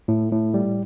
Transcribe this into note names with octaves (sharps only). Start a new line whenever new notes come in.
A2
A2
G3